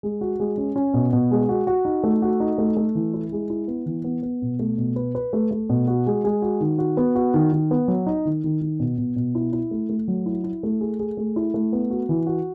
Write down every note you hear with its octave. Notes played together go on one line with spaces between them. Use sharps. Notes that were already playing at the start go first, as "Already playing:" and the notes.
G#3
F#4
G#3
C#4
C#4
B2
B2
G#3
F#4
F#4
D#4
A3
F#4
D#4
A3
A3
E3
E4
G#3
E4
B3
E3
B3
B3
B2
A3
B2
B4
B4
A3
A3
B2
F#4
G#3
G#3
F#4
D#3
F#4
B3
F#4
D#3
D#3
B3
F#3
D#4
D#3
D#3
D#3
B2
B2
B2
E4
E4
A3
A3
F#3
E4
E4
A3
G#4
G#4
A3
E4
A3
B3
F#4
E3
F#4